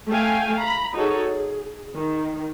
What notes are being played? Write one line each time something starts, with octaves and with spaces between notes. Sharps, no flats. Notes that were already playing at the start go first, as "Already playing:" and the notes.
A3 F5 G5 G#5
A#5 B5
D#4 F#4 G#4 A4 C#5
G#4
D#3